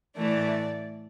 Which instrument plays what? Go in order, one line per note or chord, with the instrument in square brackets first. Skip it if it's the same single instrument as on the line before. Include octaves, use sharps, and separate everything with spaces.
[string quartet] A2 E3 A3 D5